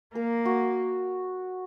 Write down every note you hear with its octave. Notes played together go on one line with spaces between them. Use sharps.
A#3 A#4
F#4